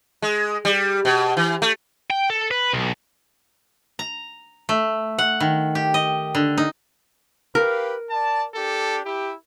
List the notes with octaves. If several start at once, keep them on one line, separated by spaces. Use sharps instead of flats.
G#3
G3
B2
E3
A3
G5
A4
B4
B1
A#5
A3
F#5
D#3
G4
D#5
D3
D#4
G4 A#4 B4 F5
D5 A5
D4 G4 A4
E4 G4